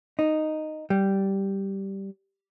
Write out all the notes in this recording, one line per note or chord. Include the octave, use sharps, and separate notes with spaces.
D#4
G3